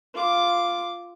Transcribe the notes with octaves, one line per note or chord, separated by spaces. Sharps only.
F4 D6